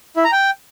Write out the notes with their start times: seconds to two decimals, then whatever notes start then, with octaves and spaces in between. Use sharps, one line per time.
0.16 E4
0.24 A#5
0.32 G5